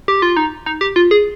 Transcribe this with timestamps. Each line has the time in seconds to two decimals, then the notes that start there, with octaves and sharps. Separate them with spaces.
0.08 G4
0.22 F4
0.36 D#4
0.66 D#4
0.81 G4
0.96 F4
1.11 G#4